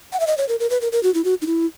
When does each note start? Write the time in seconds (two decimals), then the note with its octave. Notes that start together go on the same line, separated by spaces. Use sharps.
0.13 F#5
0.20 E5
0.27 D#5
0.38 C#5
0.49 A#4
0.60 A#4
0.70 B4
0.81 A#4
0.92 A#4
1.03 F#4
1.14 E4
1.25 F#4
1.42 D#4
1.46 E4